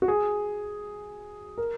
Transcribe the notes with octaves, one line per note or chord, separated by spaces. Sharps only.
F#4
G#4
A#4